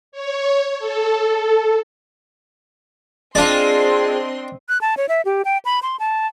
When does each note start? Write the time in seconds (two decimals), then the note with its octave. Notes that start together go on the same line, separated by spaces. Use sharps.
0.12 C#5
0.79 A4
3.35 G#3 C4 D4 F4 D5 D#5 C6
4.69 F#6
4.81 A5
4.97 C#5
5.09 E5
5.25 G4
5.45 G5
5.65 B5
5.83 C6
6.00 A5